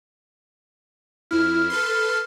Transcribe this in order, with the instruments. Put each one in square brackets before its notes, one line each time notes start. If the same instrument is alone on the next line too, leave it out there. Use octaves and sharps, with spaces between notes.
[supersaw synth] F2 E4 [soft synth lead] F6
[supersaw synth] A4 B4 C6